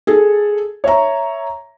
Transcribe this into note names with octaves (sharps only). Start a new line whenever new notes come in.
G#4 A4
C#5 E5 A#5